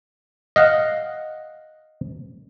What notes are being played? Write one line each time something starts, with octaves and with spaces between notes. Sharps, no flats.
D#5 F5 F#5